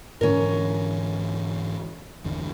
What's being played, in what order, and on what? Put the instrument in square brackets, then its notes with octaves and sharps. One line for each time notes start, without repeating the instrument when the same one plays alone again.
[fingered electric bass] G#2 D3 E3 [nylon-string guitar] C#4 A#4
[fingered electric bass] G1 E2 D3